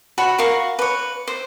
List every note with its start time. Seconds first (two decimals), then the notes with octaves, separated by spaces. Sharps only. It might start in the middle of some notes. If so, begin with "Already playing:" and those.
0.18 F#4 C#5 B5
0.38 F#4 A#4 F5 C#6
0.79 B4 C#5
1.28 C5